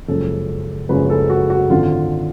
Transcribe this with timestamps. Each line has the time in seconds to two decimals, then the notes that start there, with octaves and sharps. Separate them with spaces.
0.08 F#1 F#2 F3 G#3 A4
0.89 F#1 F#2 F3 G#3 B4
1.10 A4
1.30 F#4
1.50 F#4
1.70 G#1 F#2 D3 F4